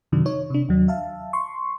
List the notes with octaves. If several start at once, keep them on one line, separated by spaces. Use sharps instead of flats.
F#2 C3 D#3 F#3 D4
D#4 C#5
C3 D4
D#2 F#3
E5 F5 A5
C6 C#6